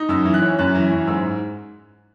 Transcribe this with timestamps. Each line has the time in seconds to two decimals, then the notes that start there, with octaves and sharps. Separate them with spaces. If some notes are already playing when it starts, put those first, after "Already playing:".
Already playing: D#4
0.09 F#2 E6
0.25 E3
0.34 F#6
0.42 C#4
0.59 F#2 F#6
0.75 E3
0.91 F#2
1.07 G#2 E6